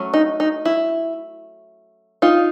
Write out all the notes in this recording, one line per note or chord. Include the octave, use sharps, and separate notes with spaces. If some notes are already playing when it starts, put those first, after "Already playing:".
Already playing: F#3 A3 C#4
D#4
D#4
E4
D#4 F4